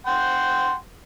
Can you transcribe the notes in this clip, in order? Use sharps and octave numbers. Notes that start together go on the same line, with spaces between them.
F#5 G5 C6